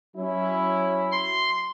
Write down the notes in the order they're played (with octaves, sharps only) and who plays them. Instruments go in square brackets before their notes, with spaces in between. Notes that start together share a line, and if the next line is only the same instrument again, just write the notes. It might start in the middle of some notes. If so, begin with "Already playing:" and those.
[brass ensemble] F#3 C#4 E4
[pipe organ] C6